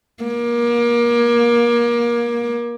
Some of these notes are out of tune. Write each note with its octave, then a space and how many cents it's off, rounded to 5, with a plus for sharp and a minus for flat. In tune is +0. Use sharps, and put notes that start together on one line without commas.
A#3 +30